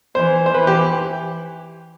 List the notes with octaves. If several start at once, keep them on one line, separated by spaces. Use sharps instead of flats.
E3 C5
C5
E3 B4
G4